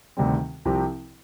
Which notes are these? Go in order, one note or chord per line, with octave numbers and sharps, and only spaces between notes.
D2 C3 D#3 G3 C4
C2 C3 F3 C4 G4